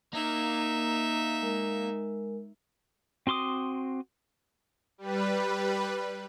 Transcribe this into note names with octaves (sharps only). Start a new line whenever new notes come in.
A#3 D#4 E5
G#3 A#4
C4 F#4 C6 D6 D#6
G3 B4